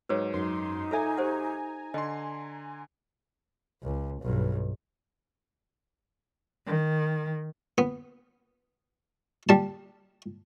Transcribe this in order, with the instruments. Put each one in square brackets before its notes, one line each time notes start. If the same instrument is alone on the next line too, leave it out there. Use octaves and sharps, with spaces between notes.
[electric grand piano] G#2 F#3 [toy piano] B4 C#5
[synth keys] F#2 C6 [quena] D#4
[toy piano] F4 A4 E5 [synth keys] G#5 A#5
[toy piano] G4 C5 F#5
[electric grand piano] D3 C6 [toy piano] D#5
[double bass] C#2
B1 G2
[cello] D#3
[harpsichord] B3
G3 A5